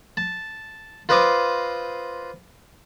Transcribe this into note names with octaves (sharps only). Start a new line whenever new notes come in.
A5
F4 B4 C5 D#5 D6